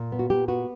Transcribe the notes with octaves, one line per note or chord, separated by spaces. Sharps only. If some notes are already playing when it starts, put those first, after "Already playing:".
Already playing: A#2
B3
F#4
A#2 G4
B3 F#4